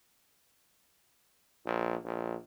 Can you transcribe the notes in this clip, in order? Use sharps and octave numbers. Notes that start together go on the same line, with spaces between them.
A#1
A#1